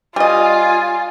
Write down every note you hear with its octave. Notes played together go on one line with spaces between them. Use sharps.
G3 F4 D#5 G#5